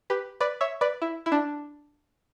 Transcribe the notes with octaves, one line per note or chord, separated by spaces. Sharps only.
G4 B4
B4 D5
C#5 E5
B4 D5
E4
E4
D4